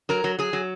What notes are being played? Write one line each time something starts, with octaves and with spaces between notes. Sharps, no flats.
F#3 A#4
F#3
F#3 G#4
F#3